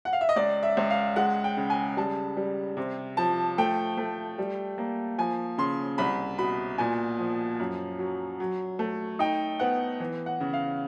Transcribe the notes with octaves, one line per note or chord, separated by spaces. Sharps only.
F#5
F5
E5
D#5
C#2 D5
E5
C#2
F5
G#3 F#5
G5
C#3
G#5
G3 A5
G3
C3
F3 A5
A3 G5
A3
G3
A#3
F3 G#5
C#3 C6
C2 B5
B2 B5
A#2 G#5
F3
F#2
F#3
F#3
A3
D#4 G5
B3 F#5
E3
F#5
C#3
F5